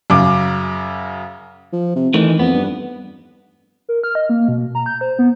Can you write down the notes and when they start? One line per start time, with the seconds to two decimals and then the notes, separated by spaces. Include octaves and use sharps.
0.10 F#2 C#3 D6
1.73 F3
1.96 C3
2.14 D#3 E3 A3
2.39 F2 B3
2.54 G2
3.89 A#4
4.04 F6
4.15 D#5
4.29 A#3
4.48 B2
4.75 A#5
4.86 G6
5.01 C5
5.19 B3